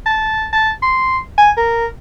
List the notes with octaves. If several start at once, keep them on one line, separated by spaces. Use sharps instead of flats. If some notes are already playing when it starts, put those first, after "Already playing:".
A5
A5
C6
G#5
A#4